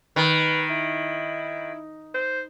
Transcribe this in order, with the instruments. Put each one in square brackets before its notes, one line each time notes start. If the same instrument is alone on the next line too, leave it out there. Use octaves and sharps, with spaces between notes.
[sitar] D#3 [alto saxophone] B4
[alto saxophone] E4
C5